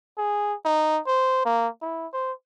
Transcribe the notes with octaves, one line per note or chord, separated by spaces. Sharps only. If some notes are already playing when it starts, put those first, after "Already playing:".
G#4
D#4
C5
A#3
E4
C5